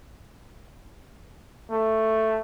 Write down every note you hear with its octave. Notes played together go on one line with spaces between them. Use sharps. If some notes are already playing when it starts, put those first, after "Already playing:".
A3